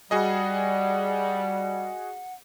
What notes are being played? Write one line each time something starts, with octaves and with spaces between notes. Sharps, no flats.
G3 F#4 G#4 D#5 F#5